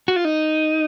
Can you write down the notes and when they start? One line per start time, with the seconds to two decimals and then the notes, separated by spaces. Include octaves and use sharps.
0.08 F#4
0.16 F4
0.25 D#4